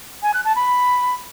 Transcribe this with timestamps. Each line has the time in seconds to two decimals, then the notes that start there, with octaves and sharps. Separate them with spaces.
0.23 G#5
0.34 F#6
0.45 A5
0.56 B5